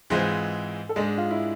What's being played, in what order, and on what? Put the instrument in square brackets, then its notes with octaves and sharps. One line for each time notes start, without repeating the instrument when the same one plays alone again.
[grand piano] G#2 E3 G#3 C4 F4 [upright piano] G#4
[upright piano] A4
[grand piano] G#2 G#3 D4 [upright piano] G#4
[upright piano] F4
E4